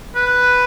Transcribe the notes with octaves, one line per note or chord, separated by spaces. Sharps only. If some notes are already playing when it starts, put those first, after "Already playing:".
B4